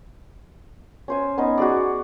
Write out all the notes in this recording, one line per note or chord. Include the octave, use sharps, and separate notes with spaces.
C#4 C5 G#5
B3 C#4 D#4
F#4 G#4 D5